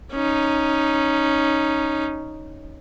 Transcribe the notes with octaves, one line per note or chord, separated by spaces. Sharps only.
C#4 D#4